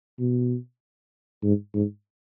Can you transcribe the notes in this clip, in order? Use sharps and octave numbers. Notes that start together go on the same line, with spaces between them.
B2
G#2
G#2